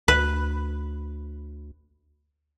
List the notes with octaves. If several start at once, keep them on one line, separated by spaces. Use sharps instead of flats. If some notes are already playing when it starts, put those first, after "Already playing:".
D2 B4